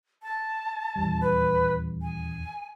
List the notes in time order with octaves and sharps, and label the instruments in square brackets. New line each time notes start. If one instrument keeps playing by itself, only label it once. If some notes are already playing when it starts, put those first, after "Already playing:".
[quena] A5
[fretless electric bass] D#1 E2 G3
[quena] B4
G#5